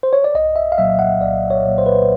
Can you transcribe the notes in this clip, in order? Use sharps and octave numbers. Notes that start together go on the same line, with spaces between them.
C5
C#5
D5
C2 D#5
E5
F5
A#2 F#3 A#3 E5
F#5
C2 D5
C#5
A#2 F#3 A#3
C5
B4
C5